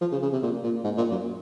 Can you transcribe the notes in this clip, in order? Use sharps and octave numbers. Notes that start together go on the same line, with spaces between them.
F3
C#3
C#3
C3
A#2
A#2
G#2
A#2
F#2